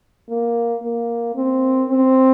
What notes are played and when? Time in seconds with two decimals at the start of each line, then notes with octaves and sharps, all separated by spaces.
0.29 A#3
0.83 A#3
1.35 C4
1.89 C4